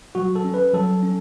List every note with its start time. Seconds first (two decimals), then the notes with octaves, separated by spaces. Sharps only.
0.15 F#3 F#4
0.35 A4
0.44 C#4
0.54 B4
0.74 F#3 A4
1.03 C#4